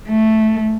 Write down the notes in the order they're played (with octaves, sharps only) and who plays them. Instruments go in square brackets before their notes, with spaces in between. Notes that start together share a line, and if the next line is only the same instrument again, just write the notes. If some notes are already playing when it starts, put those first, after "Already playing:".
[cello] A3